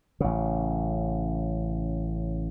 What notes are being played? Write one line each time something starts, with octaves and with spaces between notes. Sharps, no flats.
A1 C#3